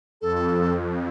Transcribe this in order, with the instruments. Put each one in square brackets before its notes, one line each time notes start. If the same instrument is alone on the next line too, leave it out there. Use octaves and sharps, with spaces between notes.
[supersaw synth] F2 [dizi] A4